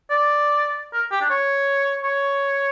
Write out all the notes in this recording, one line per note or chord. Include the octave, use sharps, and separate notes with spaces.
D5
A#4
G4
D4
C#5
C#5